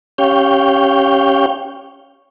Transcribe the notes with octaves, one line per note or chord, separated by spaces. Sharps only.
C#4 G4 C#5 F5 G5